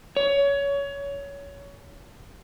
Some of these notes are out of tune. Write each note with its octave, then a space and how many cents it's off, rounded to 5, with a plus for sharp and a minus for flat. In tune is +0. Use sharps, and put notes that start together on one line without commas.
C#5 +20